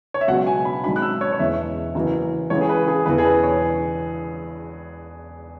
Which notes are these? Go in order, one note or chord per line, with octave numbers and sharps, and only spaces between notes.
C#5
E5
C#2 B2 F#3 F#5
G#5
B5
G#1 G#2 F#3 B5
F#6
E6
C#5
C#5
E1 E2 E3 G#3 E5
F#1 F#2 E3
C#2 C#3 E3 C#5
G#4
B4
G#4
E1 E2 E3 B4
G#4
B4
C#5